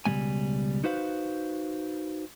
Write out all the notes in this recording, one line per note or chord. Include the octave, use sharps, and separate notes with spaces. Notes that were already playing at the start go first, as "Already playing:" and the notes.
C#2 B2 E3 G3 A3 G#5
D#4 F#4 B4 C5 F5